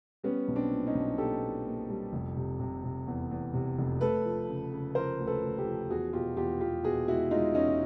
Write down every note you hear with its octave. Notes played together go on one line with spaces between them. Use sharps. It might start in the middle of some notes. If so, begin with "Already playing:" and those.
G3 B3 C#4
B1
C4 D4
A#2
C#4 D#4
B1
A#2 G4 A4
A#2
A#3
G3
F1
C3
C3
C3
E2
E2
C3
F1
A3 A4 B4
F3
C#3
C#3
F3 A#4 C5
D2
A4 B4
D2
G4 A4
F3
E2 F#4 G#4
B2 F4 G4
E2 F4 G4
E2 F4 G4
B2 F#4 G#4
G#3 E4 F#4
G#3 D#4 F4
E2 C#4 D#4